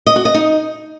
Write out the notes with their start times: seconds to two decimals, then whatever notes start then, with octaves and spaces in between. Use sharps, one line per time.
0.06 D#5
0.16 F#4
0.25 D#5
0.34 D#4